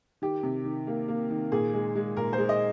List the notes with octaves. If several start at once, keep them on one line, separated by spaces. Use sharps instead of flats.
D#3 G4
C3
D#3
A#3
A#3
D#3
A#2 G#4
G#3
G#3
A#2 A#4
C5
G#3
D#5